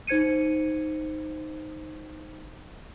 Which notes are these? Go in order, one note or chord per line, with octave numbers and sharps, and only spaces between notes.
D#4 C5 G#6 C#7 D#7